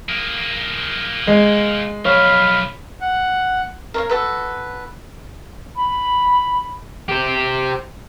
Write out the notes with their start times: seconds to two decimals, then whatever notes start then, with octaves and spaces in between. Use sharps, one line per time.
0.09 A#3 G#4
1.27 G#3
2.05 B1 F3 C#5 F5 B5
3.01 F#5
3.94 A#4 C#5 F5
4.10 F#4 A4 B4
5.76 B5
7.08 G4 C5